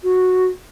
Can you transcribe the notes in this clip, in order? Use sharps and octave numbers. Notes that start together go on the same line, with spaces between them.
F#4